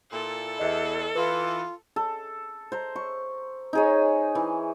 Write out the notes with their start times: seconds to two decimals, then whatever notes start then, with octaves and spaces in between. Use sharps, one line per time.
0.12 A#2 E4 A4
0.59 E2 D#5 E5
1.15 E3 F4 B4
1.96 A4
2.72 C5 A#5
2.96 C#6
3.73 D#4 G#4 C#5
4.35 E3